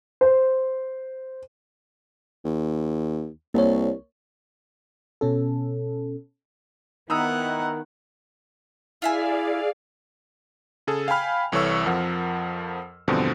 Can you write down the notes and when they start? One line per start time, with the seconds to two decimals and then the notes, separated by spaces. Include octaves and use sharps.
0.21 C5
2.44 D#2
3.54 C2 A#3 C#5
5.21 B2 C#4 A4
7.10 D#3 B3 E4 F#5 A#5 D#6 E6
9.02 E4 F4 G#4 D5 E5 F5 G#5
10.87 C#3 G#4 A4
11.08 F5 G5 G#5 B5 F6
11.52 C2 E3 A4 C#5 C#6 E6
11.86 F2 F3 A#4 F#5
13.08 E2 G2 B2 D3 F3 C4